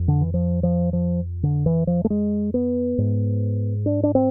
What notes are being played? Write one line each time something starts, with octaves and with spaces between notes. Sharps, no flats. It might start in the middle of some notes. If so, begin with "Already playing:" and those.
Already playing: F2
D3
E3
F3
F3
F3
D3
E3
F3
A3
G#3
B3
G#2
D4
D4
C4